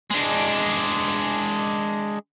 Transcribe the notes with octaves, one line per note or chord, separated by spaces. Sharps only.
G#3 D4